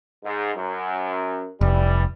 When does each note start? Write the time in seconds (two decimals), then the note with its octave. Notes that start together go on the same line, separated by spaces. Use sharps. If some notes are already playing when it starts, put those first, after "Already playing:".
0.25 G#2
0.55 F#2
1.61 F1 E3 G3